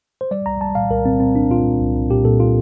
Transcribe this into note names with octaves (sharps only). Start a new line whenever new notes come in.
C5
G3 D5
C2 A#5
G3 A5
A#2 F5
C2 A#4
A#2 C4
A#2 C4
C2 D4
A#2 F4
A#2
C2
C2
A#2 G4
A#2 A4
F4